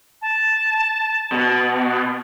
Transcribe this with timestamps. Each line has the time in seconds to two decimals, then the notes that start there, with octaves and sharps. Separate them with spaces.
0.22 A5
1.32 B2